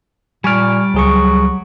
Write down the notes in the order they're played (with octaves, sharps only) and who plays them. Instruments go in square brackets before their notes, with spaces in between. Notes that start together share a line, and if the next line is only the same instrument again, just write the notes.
[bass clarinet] A#2 [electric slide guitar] G3 D5 [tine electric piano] G#5 C#6 F6
[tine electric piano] C#2 G#4 C#6 [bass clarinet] F#3